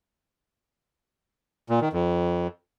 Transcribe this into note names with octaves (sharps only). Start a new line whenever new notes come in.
A#2
D#3
F2